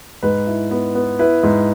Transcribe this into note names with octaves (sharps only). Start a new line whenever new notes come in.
G#2 B4
E4
B3
B3
E4 B4
G#2